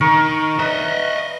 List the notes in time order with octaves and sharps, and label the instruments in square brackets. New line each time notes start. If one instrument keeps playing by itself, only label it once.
[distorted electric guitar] D#3 [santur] A#4 C#6
[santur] B4 [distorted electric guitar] D#5 E5